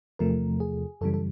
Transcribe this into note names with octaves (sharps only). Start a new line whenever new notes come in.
E2 C3 F3 A3 A#4
G#4
F#2 C#3 E3 G3 A4
A4